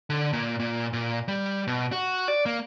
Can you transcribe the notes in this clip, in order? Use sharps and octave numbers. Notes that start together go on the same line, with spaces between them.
D3
A#2
A#2
A#2
G3
B2
F#4
D5
A#3